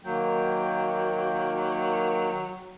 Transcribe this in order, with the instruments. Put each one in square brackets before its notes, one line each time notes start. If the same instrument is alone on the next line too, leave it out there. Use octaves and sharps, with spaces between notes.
[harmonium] D#3 A#3 G5 [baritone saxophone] F#3